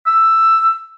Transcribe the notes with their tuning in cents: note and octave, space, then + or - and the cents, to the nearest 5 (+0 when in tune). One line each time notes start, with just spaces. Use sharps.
E6 +10